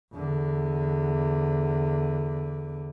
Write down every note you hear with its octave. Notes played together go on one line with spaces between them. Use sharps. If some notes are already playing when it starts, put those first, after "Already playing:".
E2 D3